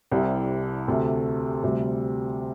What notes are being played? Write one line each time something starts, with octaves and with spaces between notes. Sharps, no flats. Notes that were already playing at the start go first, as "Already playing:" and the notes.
C2 C3 G3 E4
D2 C3 A3
D2 C3 G3